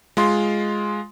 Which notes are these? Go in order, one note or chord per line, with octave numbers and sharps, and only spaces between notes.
G#3 F4 C6